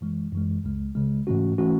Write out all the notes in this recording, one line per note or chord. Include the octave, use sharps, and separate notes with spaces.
F#2 E3 G#3
F#2 E3 G#3
C#2 C#3 G#3
C#2 C#3 G#3
G#2 E3 A3 C#4 F#4
E3 A3 C#4 F#4